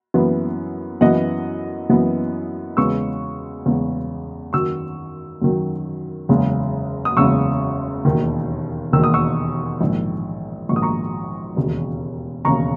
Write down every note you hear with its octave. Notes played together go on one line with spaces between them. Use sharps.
F#2 E3 B3
F#2 E3 B3 D#5 F#5
F#2 E3 B3
E2 C#3 G#3 B3 C#6 E6
E2 C#3 G#3 B3
F#2 D#3 F#3 C#6 E6
F#2 D#3 F#3
F#1 E2 C#3 G#3
D#6
F#1 E2 C#3 G#3 C#6 E6
E1 D#2 D#3
E1 D#2 D#3 E6
D#6
C#6 E6
A#1 G#2 D#3
A#1 G#2 D#3 C#6
D#6
A#5 C#6
E1 D#2 C#3
E1 D#2 C#3 A#5 C#6